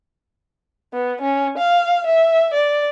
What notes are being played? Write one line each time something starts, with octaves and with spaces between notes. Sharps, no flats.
B3
C#4
F5
E5
D5